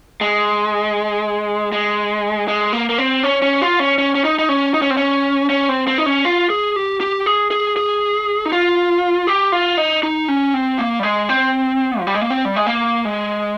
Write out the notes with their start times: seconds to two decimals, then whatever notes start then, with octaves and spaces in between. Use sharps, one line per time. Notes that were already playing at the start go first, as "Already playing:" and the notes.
0.21 G#3
1.72 G#3
2.48 G#3
2.73 A#3
2.89 A#3
2.98 C4
3.23 C#4
3.42 C#4
3.62 F4
3.80 C#4
3.98 C#4
4.15 C#4
4.25 D#4
4.39 D#4
4.49 C#4
4.74 D#4
4.82 C#4
4.90 C4
4.97 C#4
5.50 C#4
5.69 C4
5.87 C4
5.98 D#4
6.06 C#4
6.25 F4
6.50 G#4
6.76 G4
7.01 G4
7.26 G#4
7.51 G#4
7.77 G#4
8.45 D#4
8.52 F4
9.27 G4
9.52 F4
9.78 D#4
10.03 D#4
10.28 C#4
10.54 C4
10.79 A#3
11.00 G3
11.03 G#3
11.29 C4
11.99 F3
12.07 G3
12.15 G#3
12.21 A#3
12.30 C4
12.45 G3
12.56 G#3
12.67 A#3
13.05 G#3